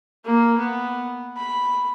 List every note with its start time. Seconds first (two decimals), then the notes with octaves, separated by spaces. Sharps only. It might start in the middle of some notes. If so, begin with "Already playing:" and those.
0.25 A#3
0.58 B3
1.37 B5